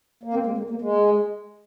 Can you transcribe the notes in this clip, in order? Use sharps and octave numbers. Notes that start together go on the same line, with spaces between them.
A#3
C4
G#3
A#3
A#3
G#3